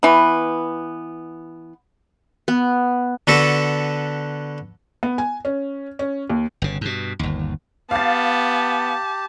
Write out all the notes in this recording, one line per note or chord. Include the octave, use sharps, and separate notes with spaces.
E3 B3
B3
D3 B3 F#4 A4 B4
B3
G#5
C#4
C#4
D#2
G1 C#3
G2 B2
G1 D#2
B3 G4 F5 A5 A6